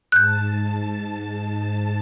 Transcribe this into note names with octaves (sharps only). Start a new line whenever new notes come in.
G#2 A5 F#6 G6